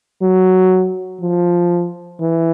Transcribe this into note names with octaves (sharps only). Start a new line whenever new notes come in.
F#3
F3
E3